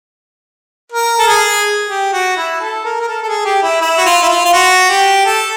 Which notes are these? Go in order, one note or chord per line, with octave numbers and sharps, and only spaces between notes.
A#4
A4
G#4
G4
F#4
E4
A4
A#4
A#4
A4
A4
G#4
G4
E4
E4
F#4
F4
E4
F4
F4
F#4
G4
A4